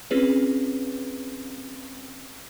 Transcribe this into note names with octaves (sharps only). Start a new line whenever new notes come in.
C4 C#4 F4 G#4 B4 C#5